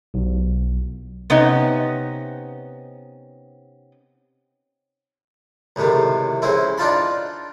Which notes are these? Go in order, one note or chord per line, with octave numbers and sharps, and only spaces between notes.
B1
C3 B3 C#4 D#4
C#2 A2 C3 D#3
C#3 G#3 C4 E4
D4 D#4 F4 A5 B5